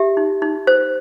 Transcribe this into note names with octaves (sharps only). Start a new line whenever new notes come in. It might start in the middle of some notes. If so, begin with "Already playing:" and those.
Already playing: G4 E5
D#4
D#4
C5